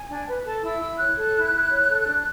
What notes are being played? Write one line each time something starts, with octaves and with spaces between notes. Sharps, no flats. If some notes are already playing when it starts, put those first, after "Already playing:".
Already playing: G#5
D4
B4
A4 A5
E4 E6
E4 E6
C#5 F#6
A4
E4
E4
C#5
A4
D4